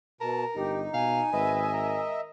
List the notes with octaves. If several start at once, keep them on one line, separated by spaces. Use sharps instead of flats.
B2 A#4 A5
G1 D#4 G4
B2 F5 G#5
G#1 B4 D#5 E5
A#4